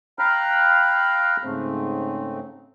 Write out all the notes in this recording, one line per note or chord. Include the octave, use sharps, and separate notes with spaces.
F5 G5 A#5 B5 F6 F#6
G#2 C#3 A3 C4